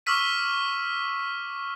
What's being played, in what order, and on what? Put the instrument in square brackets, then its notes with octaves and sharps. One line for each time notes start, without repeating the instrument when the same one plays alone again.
[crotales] C#6 D6 E6 F6 B6 D#7